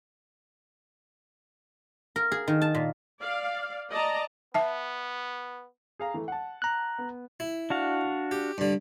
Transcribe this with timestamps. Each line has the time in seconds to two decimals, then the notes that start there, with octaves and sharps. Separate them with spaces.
2.16 A#4
2.32 G#4
2.48 D#3
2.61 A5
2.75 A#2
3.20 D5 F5
3.91 D5 D#5 A5 A#5
4.54 B3 E5 A5
5.99 G#4 F5 A#5
6.14 E3 A3
6.28 F#5 A5
6.62 A#5 F#6
6.98 B3
7.40 E4
7.70 D4 F#4 F5
8.31 G4
8.58 G2 D3